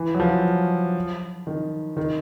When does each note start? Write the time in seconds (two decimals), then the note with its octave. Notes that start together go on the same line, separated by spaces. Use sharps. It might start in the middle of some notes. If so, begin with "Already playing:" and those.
Already playing: E3
0.14 F#3
0.20 F3
1.47 D#3
1.97 D#3